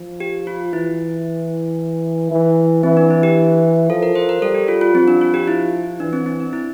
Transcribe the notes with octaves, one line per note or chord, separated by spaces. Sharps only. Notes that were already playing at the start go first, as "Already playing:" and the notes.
Already playing: F3
G4
F4
E3 E4
E3
E3 C4
D4
E4
G4
F3 A4
A#4
C5
A#4
G3 A4
G4
F4
F4
F3 C4
D4
F4
G4
E4
E3 D4
C4
C4
D4
E4